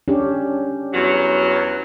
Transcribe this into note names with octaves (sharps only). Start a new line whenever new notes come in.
C#4 D4 G4
E2 F#3